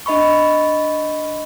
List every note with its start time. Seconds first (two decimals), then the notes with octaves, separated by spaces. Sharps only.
0.06 D4 D#5 B5 C#6